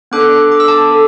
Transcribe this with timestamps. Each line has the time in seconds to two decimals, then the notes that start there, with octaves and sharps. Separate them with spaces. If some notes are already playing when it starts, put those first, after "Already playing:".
0.11 B3 D4 A4 D6 F#6
0.52 D6
0.60 E6
0.68 A5 D6
0.91 A4